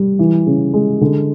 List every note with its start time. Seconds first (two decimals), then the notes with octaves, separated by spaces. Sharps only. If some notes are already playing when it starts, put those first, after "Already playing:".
Already playing: G3
0.19 E3
0.47 C#3
0.74 G#3
1.01 D3